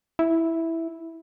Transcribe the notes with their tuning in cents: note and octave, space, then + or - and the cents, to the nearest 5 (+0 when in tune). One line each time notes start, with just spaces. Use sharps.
E4 -5